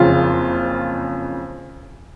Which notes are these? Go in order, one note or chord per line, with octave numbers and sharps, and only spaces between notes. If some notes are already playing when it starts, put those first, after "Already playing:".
Already playing: F#1 F2 C#3 F4